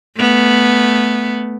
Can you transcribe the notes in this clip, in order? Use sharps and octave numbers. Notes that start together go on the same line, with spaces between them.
A3 B3